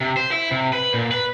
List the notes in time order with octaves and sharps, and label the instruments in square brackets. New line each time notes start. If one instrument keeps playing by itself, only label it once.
[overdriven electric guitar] C3
C5
E4
C3
B4
A#2
B4